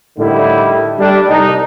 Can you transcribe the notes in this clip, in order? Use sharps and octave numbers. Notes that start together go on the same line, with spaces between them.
A2 D3 D#3 G3 E4
G3 A3 D4
C2 D#4